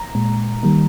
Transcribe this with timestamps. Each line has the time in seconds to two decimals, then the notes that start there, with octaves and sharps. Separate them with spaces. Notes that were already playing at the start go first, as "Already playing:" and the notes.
Already playing: A#5
0.15 A#2 G#3
0.63 D#3 G3 A#3